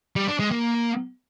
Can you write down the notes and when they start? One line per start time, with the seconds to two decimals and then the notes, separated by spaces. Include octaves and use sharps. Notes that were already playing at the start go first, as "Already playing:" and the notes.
0.16 G3
0.28 D4
0.40 G#3
0.51 A#3